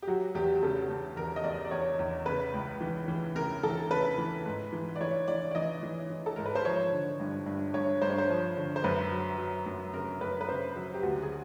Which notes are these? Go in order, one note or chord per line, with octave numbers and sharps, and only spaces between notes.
G4
F#3 F#4
E2 G4
C#3 A4
C#3
E2 A#4
D#5
E2 D5
D5
E2 C#5
E2
C#3 B4
C#2
E3
E3
C#3 A#4
E3 A4
C#3 B4
E3
G#2
E3
D5
E3 C#5
E3 D5
D5
E3 D#5
E3
E3
A4
G#2 A#4
B4
C5
F3 C#5
D3
G2
G2
G2 C#5
G2 C5
C#5
C5
F3
D3
C5
F#2 B4
F#3
F#3
F#2
C#3 A#4
F#2 B4
B4
C#3 C5
F#3
G4
D2 F#4
G#4